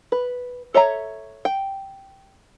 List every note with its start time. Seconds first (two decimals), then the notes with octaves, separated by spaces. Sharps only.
0.12 B4
0.74 A4 C#5 E5 A#5
1.45 G5